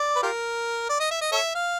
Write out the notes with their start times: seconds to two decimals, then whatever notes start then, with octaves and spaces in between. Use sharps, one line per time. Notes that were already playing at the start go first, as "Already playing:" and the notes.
Already playing: D5
0.16 B4
0.23 F4 G4 A#4
0.89 D5
1.00 D#5
1.11 E5
1.21 D#5
1.32 A4 C#5 E5
1.55 F5